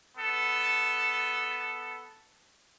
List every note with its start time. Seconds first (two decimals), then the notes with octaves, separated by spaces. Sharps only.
0.18 B3 A4